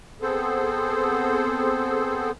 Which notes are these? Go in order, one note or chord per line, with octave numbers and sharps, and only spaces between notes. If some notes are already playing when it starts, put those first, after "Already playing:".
B3 C4 G#4 A4 C5